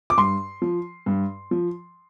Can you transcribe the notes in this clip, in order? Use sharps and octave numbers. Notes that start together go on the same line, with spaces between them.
D6
G2 C6
F3
G2
F3